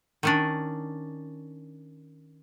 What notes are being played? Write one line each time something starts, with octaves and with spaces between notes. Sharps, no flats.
D#3 C#4 D4